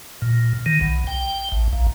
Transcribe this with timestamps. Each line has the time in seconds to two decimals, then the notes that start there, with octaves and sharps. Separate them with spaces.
0.22 A#2
0.66 D#3
0.81 B1
1.07 G5
1.52 A1
1.73 A#1